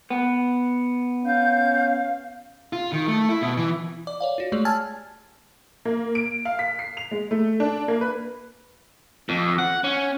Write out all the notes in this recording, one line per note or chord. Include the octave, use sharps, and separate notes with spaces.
B3
C#4 F5 G6
F4
D#3
A3
E4
B2
E3
D5 D6
C#5 D5 F5
F4 F#4
G#3 A3 G4 G#4 C#5 D5
G#5 A5 E6 F6 G#6 A6
A#3
D7
F5
B6
C7
F7
G#3
A3
D4
A#3
B4
F2
F#5
C#4